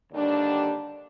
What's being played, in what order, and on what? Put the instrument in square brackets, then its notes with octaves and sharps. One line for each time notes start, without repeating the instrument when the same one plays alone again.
[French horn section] D#2 D3 G3 D4